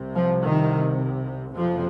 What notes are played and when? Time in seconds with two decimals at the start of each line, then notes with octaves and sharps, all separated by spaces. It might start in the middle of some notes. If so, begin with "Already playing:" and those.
Already playing: C2 C3
0.15 F3
0.43 D#3
1.55 F#1 F2 C3 F3